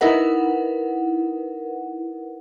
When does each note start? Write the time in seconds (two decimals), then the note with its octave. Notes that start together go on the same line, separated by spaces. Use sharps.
0.01 D#4 E4 A#4 B4 F#5